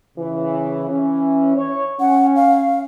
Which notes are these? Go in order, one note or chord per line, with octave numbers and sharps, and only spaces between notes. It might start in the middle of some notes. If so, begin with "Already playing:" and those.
C#3 E3
E3 C#4
C#5
C#4 F#5
F5